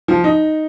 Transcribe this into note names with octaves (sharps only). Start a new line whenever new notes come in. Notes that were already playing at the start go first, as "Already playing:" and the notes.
F3
D#4